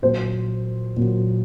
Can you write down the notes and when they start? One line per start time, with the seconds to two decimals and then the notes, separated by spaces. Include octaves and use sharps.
0.02 A#2 F#3 C5
0.97 A#2 F#3